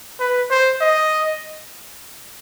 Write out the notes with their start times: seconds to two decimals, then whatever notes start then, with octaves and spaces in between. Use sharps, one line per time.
0.20 B4
0.50 C5
0.81 D#5